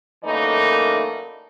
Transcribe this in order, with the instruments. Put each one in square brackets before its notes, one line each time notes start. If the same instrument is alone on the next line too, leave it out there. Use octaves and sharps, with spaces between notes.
[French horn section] F#2 E3 A3 A#3 D#4 D5